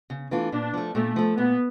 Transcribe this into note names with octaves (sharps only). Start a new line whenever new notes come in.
C#3
E3 A3 D4 F4
A#2 D4
F3 A3
A#2 A3
F3 A3
A#2 B3